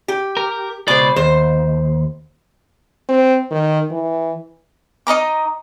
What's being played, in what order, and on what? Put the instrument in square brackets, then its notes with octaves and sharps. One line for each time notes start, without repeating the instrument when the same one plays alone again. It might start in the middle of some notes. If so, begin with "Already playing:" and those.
[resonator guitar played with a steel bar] G4
[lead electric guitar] A#4
[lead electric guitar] C#2 D5 [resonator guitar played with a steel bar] B2 C5
[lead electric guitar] D#2 [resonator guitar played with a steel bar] C5
[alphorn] C4
D#3
E3
[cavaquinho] D#4 D#5 A#5 D6